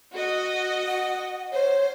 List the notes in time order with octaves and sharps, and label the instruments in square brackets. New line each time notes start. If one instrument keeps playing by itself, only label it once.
[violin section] F#4 D#5
[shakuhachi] F#5
[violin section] C5 [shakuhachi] C#5